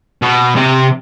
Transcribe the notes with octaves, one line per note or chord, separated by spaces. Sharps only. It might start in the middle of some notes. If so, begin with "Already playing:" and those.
B2
C3